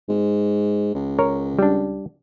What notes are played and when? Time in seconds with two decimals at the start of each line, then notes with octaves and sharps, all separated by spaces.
0.09 G#2
0.95 C#2
1.19 A#4 C#5
1.59 G3 D4